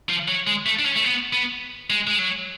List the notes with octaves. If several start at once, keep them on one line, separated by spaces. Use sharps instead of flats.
F3
F#3
G#3
A3
D4
C#4
A3
B3
B3
G#3
G#3
F#3